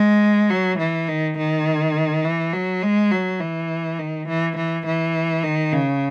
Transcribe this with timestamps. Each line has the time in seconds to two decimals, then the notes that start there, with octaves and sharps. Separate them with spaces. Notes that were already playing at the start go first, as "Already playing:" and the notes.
Already playing: G#3
0.51 F#3
0.79 E3
1.09 D#3
1.38 D#3
2.25 E3
2.53 F#3
2.83 G#3
3.12 F#3
3.41 E3
3.99 D#3
4.28 E3
4.57 E3
4.86 E3
5.44 D#3
5.73 C#3